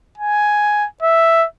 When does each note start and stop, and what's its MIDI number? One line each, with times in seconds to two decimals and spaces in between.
0.18 0.87 80
1.02 1.46 76